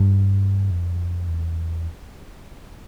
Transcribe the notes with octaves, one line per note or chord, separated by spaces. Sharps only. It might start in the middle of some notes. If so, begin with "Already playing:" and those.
Already playing: G2
F2
E2